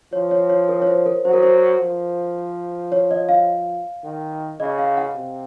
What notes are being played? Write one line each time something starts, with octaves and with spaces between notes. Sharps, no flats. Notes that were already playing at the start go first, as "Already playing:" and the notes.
F3 C#5
C#5
C#5
A#4
C#5
C5
A#4
F#3 C5
A#4
C5
F3
C#5
D#5
F5
D#3
C#3 D#5
F5
F#5
C3